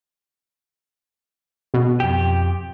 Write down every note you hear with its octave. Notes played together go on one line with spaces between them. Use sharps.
B2
F2 G4